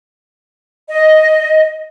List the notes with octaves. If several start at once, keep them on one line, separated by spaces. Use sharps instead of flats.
D#5